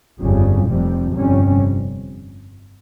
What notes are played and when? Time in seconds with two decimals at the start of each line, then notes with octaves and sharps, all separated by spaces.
0.20 G1 F2 C#3 G3
0.66 F1 F2 C3 G3
1.14 G1 F2 C3 G3 C#4